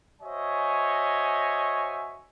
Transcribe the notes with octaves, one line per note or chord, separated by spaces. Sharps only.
F#4 C5 C#5 D#5 E5 G#5